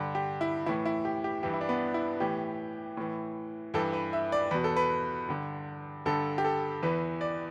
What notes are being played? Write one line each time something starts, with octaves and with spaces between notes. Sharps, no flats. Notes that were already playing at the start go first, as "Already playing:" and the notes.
Already playing: G2 D3
G4
E4
A2 E3 E4
E4
G4
G4
G2 E3 G4
E4
D4
B3
E4
A2 E3 G4
A2 E3
G2 E3 A4
B4
E5
D5
E2 B2 B4
A4
B4
G2 D3
G2 D3 A4
G4
A4
E2 E3 B4
D5